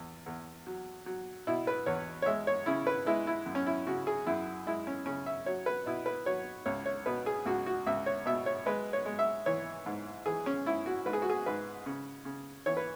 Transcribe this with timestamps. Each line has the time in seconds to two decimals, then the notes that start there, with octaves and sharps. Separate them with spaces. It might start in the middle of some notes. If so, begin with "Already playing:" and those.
Already playing: E2
0.26 E2
0.67 F#3
1.06 F#3
1.47 B2 E4
1.67 B4
1.86 E2 C#5
2.22 C#5
2.26 G#3 E5
2.47 C#5
2.66 C#3 E4
2.87 B4
3.06 G#3 E4
3.27 E4
3.46 F#2
3.55 C#4
3.66 E4
3.87 C#3 F#4
4.07 G#4
4.26 F#2 E4
4.67 G#3 E4
4.87 C#4
5.06 C#3 C#4
5.26 E5
5.46 F#3 C#5
5.66 B4
5.86 B2 E4
6.06 B4
6.26 F#3 C#5
6.66 C#2 C#5
6.86 C#5
7.06 B2 B4
7.26 G#4
7.46 C#2 F#4
7.66 F#4
7.86 C#2 E5
8.06 C#5
8.26 B2 E5
8.46 C#5
8.66 G#3 B4
8.93 C#5
9.06 G#3
9.19 E5
9.46 E3 C#5
9.86 G#2
10.26 E3 G#4
10.46 C#4
10.66 G#2 E4
10.86 F#4
11.06 G#2 B4
11.13 G#4
11.22 F#4
11.30 G#4
11.46 G#2 B4
11.86 C#3
12.25 C#3
12.66 E3 C#5
12.77 B4